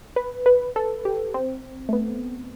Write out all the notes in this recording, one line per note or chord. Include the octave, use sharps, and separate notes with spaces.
B4
B4
A4
G4
C4
A3
B3